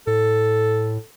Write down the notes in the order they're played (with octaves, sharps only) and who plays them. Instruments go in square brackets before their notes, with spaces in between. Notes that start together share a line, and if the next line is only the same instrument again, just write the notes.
[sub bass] A2 [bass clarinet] A4